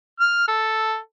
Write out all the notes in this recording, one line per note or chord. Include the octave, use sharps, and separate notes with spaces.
F6
A4